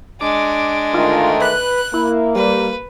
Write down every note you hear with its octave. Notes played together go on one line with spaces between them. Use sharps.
G#3 D4 D6
D2 D#3 A3 F4
B4 F#6
A#3 E4
G3 B4